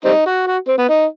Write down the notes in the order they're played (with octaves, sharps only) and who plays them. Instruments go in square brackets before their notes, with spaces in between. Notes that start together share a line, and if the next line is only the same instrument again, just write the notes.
[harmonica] G3 C4 D#4
F#4
F#4
C4
B3
D#4